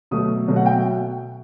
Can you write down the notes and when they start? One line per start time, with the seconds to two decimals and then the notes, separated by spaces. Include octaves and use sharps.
0.11 B2 F#3 A3 D#6
0.48 B2 F#3 A3
0.56 F#5
0.66 G5
0.74 E5